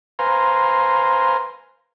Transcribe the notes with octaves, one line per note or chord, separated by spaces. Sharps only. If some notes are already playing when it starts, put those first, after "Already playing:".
B4 C5 F5 G#5 A#5 C6